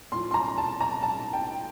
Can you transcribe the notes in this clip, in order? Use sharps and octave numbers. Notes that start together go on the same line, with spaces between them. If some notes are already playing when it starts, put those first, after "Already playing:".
A2 F3 C6
C6
A#5
A5
A#5
A5
G5